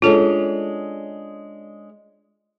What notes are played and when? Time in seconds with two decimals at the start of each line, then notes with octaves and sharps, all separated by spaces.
0.02 G#3 C#4 D4 F4 A4